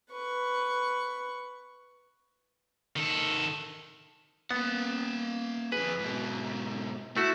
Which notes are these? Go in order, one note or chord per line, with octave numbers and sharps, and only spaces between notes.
B4 C#6
D#3 A4
A#3 B3 F#5
F2 G#4 B4
G#2 B2
A3 E4 F#4